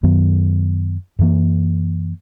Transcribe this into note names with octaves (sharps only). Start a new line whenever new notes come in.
F#2 D#3 F#3 B3
F#2 E3 A#3